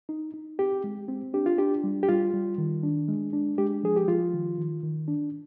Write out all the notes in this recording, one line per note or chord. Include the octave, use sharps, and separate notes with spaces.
D#4
D#4
C4 G4
G#3
C4
D4 G4
F4
D4 G4
G3
G4
G3 F4
G3
D#3
D4
G#3
D4
G#3 G4
F3 G#4
G4
F3 F4
D#3
D#3
D#3
D4